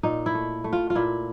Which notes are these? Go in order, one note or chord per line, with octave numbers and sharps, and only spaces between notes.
A#2 D#4
E4
A3
A3
F4
F4
A#2 E4